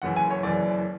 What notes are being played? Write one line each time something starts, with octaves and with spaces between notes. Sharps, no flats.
F#1 F#2 E3 F#5
G#5
C#5
F#1 F#2 E3 D5